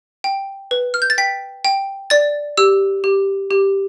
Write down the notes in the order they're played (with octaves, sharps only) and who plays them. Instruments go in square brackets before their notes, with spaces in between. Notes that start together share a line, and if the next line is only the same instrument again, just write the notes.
[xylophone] G5
B4
F6
G6
A6
G5 B6
G5
D5 A6
G4 E6
G4
G4